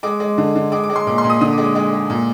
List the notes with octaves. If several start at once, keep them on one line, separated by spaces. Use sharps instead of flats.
G#3 D6
G#3
D3
D3
G#3 D6
D6
G#3
C6
A#2 D6
C6
A#2
D#6
D3 D#6
D6
G#3
D6
G#3
G#3
A#2